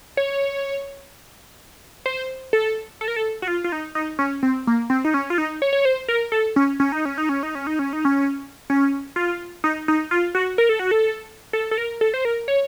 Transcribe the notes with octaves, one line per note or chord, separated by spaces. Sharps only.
C#5
C5
A4
A4
A#4
A4
F#4
F4
F4
D#4
D#4
C#4
C4
A#3
C4
D#4
C#4
F4
D#4
C#5
C#5
C5
A#4
A4
C#4
C#4
D#4
C#4
D#4
C#4
D#4
C#4
D#4
C#4
D#4
C#4
C#4
F4
D#4
D#4
F4
F#4
A#4
A4
F#4
A4
A4
A4
A#4
A4
C5
A#4
C#5